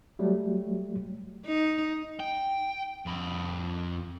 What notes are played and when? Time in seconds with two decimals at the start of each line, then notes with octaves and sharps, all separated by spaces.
0.19 F#3 G3 A3
1.47 D#4
2.20 G5
3.06 F2 B5